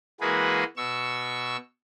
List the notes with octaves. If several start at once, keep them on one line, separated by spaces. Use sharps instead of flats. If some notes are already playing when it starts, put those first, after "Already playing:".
E3 G#3 A#3 F#4 G#4 B4
B2 C#6 E6